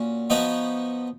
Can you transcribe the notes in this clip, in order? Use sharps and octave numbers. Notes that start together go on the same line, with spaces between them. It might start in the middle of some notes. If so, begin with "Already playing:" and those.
Already playing: A#2 C#4 F#4
F3 B3 D#4 F#4 C#5